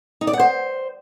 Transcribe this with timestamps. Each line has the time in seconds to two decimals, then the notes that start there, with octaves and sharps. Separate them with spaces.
0.21 D#4
0.27 D5
0.33 F#5
0.40 C5